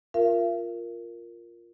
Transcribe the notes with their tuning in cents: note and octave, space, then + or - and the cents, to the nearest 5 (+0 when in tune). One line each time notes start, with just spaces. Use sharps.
F4 +0 A#4 +0 E5 +45